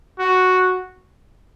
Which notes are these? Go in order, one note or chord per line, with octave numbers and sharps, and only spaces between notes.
F#4